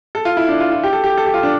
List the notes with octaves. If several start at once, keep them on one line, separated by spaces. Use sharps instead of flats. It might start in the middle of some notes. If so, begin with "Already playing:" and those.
A4
F4
E4
D4
F4
F4
G4
A4
G4
A4
G4
F4
D4